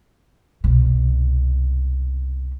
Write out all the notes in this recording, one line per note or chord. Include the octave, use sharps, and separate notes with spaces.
C2 B2